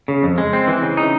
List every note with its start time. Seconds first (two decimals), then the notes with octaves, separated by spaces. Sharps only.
0.08 C#3
0.23 F2
0.38 G#3
0.53 C4
0.67 E3
0.82 C#3
0.97 D#4